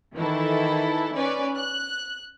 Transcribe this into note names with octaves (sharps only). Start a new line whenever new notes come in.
D#3 E3 E4 A4
C#4 B4 D5
F#6